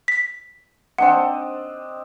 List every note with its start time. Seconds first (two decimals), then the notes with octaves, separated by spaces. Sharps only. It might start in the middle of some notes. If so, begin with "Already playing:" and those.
0.08 B6
0.98 C4 D4 D#5 F#5